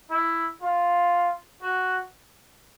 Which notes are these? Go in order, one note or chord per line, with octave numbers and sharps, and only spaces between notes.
E4
F4
F#4